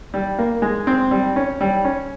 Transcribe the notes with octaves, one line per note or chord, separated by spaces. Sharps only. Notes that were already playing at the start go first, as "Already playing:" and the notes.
G3
A#3
G#3
C4
G3
C#4
G3
C#4